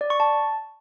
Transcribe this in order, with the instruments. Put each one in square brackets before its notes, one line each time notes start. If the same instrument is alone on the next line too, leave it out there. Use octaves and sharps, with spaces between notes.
[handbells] D5
C#6
A5